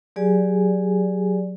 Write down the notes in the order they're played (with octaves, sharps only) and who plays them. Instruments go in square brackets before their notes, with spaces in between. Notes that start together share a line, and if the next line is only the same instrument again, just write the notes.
[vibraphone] F#3 G4 G#4 D5 G#5